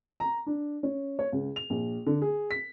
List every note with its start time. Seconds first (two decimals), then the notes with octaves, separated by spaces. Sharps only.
0.20 A#5
0.46 D4
0.83 C#4
1.19 C#5
1.32 C#2
1.56 F7
1.70 A#1
2.06 D3
2.22 G#4
2.51 B6